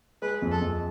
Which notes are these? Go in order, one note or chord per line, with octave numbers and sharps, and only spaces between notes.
G#3 B4
F2
A4
F2